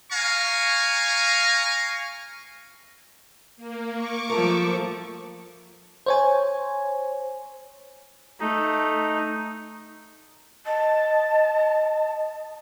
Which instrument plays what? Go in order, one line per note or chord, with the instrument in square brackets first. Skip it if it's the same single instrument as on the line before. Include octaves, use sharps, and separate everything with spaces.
[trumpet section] F5 G#5 A#5 C#6
[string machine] A#3
C#6 D6
[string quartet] F3 A3 [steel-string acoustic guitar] A#4
[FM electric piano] C5 C#5 G#5
[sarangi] A3 [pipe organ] D#4
[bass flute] D#5 [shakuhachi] A5